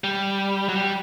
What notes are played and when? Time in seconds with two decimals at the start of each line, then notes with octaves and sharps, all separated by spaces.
0.04 G3
0.69 F#3
0.76 G3